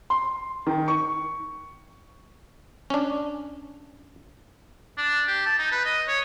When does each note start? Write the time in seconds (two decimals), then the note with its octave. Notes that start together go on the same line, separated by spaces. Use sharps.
0.10 C6
0.67 D#3
0.88 C#6
2.90 C#4 D4
4.98 D4
5.28 G4
5.46 A5
5.58 D#4
5.72 B4
5.85 D#5
6.08 C#5